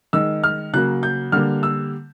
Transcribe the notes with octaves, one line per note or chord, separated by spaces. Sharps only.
D#3 G#3 E6
F6
C#3 F#3 A#3 F#6
G6
D3 G3 A#3 F6
E6